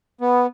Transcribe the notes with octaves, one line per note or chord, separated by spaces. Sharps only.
B3